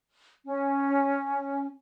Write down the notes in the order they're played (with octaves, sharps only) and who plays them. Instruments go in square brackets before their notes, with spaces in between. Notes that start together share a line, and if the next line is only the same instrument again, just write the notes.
[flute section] C#4